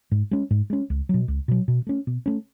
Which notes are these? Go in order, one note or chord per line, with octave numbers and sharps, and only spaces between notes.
G#2
G#3 C#4
G#2
G#3 C#4
C#2
B2 F#3
C#2
B2 F#3
B2
A3 C#4
B2
A3 C#4